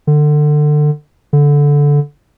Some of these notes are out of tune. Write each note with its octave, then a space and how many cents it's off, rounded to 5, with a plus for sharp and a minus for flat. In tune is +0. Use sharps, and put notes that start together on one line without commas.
D3 +25
D3 -15